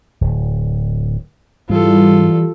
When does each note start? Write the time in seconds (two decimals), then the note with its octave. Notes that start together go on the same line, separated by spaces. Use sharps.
0.21 D1
1.70 G#2 E3 G3 F4 A4